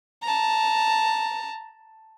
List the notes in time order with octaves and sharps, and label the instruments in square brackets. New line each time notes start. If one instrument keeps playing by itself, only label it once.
[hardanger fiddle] A5 A#5